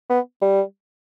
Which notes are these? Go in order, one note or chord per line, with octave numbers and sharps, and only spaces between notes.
B3
G3